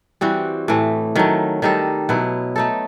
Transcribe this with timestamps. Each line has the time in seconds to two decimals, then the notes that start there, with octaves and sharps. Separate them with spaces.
0.21 E3 G3 C4 F#4
0.68 A2 E3 A3
1.16 D#3 F#3 A3
1.62 D#3 G3 D#4 A4
2.09 B2 F#3 B3 E4
2.56 A3 D#4 A4